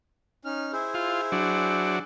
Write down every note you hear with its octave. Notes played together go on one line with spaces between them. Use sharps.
C#4 D#4 F6
E4 G#4 C5
F4
F#3 D4